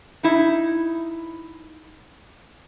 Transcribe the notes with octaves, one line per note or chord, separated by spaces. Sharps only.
D#4 E4